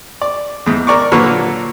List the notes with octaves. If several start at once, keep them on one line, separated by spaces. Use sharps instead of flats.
D5
E2 G#2
A#4 D5 C#6 D6
A#2 D3 F#3 A#3 B4 C#5